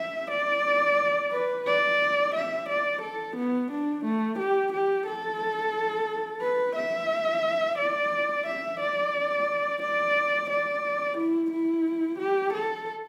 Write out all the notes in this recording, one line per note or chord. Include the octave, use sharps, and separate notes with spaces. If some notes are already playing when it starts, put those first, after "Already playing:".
Already playing: E5
D5
B4
D5
E5
D5
A4
B3
D4
A3
G4
G4
A4
B4
E5
D5
E5
D5
D5
D5
E4
E4
G4
A4